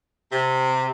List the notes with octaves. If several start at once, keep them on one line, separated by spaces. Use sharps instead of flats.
C3